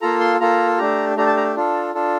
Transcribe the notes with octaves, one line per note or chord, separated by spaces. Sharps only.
A#3 F4 A4 A#5
C6
A#3 F4 A4 A#5
A3 D4 G4 A#5
A3 D4 G4 A#5
A5
A#5
D4 F4 A4
D4 F4 A4